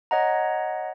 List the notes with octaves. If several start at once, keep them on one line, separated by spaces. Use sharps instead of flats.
C#5 D#5 F#5 A#5